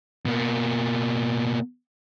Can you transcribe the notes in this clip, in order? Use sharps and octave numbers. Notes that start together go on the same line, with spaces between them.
B2 A#3